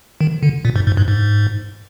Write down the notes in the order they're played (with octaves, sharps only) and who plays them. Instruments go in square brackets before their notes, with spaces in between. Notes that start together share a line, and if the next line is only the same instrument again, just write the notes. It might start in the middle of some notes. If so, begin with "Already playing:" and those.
[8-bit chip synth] D#3
D3
A#2
G#2
G#2
G2
G#2